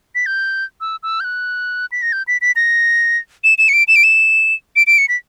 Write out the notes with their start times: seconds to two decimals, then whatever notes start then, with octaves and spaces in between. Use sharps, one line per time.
0.15 B6
0.26 G6
0.81 E6
1.03 E6
1.20 G6
1.24 F#6
1.92 B6
2.02 A#6
2.12 G6
2.28 B6
2.41 B6
2.56 A#6
3.44 E7
3.58 E7
3.69 C#7
3.73 D7
3.88 E7
3.96 D7
4.04 E7
4.76 D7
4.87 D7
4.98 C#7
5.09 B6